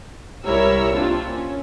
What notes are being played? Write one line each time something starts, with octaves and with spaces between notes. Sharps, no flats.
C2 G3 E4 A#4 C#5 E6
A#3 C4 D4 F4
C#4